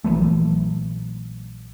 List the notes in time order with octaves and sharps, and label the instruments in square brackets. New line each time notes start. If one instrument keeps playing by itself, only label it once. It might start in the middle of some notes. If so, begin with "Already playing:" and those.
[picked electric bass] A#1 E3 F#3 A3